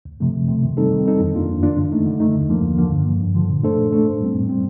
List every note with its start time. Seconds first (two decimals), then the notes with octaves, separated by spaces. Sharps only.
0.05 D2
0.20 C3 F3 A3
0.34 D2
0.49 C3 F3 A3
0.63 D#3
0.77 G3 C4 D#4 A4
0.92 D#3
1.06 G3 C4 D#4 A4
1.20 F2
1.34 D#3 A#3 D4 F4
1.49 F2
1.63 D#3 A#3 D4 F4
1.77 D3
1.92 A3 D#4
2.06 D3
2.20 A3 D#4
2.34 D#2
2.49 D3 F3 A#3
2.63 D#2
2.78 D3 F3 A#3
2.92 G2
3.06 D3 F3
3.20 G2
3.35 D3 F3
3.49 A#2
3.63 A3 D4 A4 C5
3.78 A#2
3.92 A3 D4 A4 C5
4.06 A2
4.21 G3 C4
4.35 A2
4.49 G3 C4